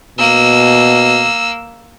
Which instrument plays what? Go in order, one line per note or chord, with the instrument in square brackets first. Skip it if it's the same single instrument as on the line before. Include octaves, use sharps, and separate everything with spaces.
[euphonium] B2 [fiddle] A#3 E6